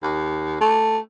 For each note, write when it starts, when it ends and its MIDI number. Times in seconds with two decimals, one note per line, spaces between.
0.03 0.58 39
0.60 0.98 57